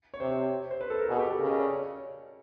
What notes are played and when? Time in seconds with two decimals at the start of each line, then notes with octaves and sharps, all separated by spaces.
0.14 C#5
0.20 C3 C5
0.71 C5
0.81 B4
0.90 A4
0.99 A#4
1.09 B2 G#4
1.19 G4
1.29 A4
1.39 C#3 A#4
1.50 D#5
1.59 D5
1.69 C#5